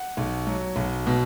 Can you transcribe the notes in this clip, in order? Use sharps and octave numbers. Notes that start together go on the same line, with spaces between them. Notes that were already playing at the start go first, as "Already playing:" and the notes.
Already playing: F#5
B1
F#3
B1
B2